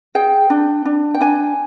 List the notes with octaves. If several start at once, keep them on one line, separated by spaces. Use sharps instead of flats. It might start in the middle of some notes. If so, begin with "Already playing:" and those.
G#4 G5
D4
D4
G5
D4 G#5